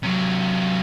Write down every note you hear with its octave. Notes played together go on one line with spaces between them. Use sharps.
C3 F#3